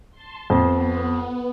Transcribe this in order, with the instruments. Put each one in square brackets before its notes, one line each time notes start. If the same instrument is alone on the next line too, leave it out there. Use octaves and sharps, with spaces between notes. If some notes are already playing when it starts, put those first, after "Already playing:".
[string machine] A5 C6
[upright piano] F2 [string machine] B3